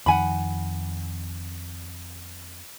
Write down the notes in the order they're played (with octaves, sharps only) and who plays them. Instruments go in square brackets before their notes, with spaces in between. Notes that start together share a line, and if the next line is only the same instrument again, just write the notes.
[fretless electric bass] F2 D#3 [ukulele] F#5 G#5 B5